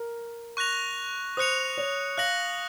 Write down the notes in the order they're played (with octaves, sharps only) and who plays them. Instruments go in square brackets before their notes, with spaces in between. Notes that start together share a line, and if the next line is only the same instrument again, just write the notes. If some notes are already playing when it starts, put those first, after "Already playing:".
Already playing: [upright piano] A#4
[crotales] C#6 F#6 A#6 F7
[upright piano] C5 [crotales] D#6 F#6 C#7 F7
[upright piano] C#5
[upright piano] F5 [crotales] F#6 A#6 C#7 F#7